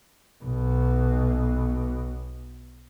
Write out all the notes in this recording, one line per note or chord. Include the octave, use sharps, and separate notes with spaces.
B1 B2